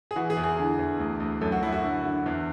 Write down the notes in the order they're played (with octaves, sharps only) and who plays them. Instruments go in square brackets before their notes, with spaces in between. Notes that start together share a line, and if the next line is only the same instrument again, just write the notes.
[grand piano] G#4
E3 F#4
G#4
E2
G#4
D3
E2
D2
D2
F#2 A4
F#4
F#2 E4
F#4
D3
D3
E2